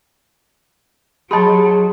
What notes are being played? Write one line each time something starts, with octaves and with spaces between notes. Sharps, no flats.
F#3 G4 G#4 D#5 A5 B5 C6